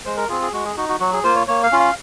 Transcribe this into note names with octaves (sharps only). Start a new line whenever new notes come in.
G#3 C5
A#4
C4 F4 G#4
G#4
G#3 F#4
G#4
D#4 F#4
F#4
F#3 F#4
G#4
A#3 F4 C5
C#5
A#3 C#5
F5
C#4 F4
F5